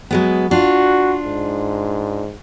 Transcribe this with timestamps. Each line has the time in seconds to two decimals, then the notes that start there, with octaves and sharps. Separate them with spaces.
0.11 F#3 G#3 B3
0.51 D4 F4 F#4
1.25 G#2